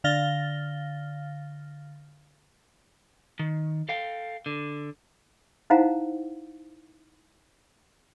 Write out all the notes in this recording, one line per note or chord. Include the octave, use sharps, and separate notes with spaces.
D3 F5 F6 A6 A#6 G7
D#3
A4 F5 G5
D3
D#4 E4 C5 F5 F#5 A#5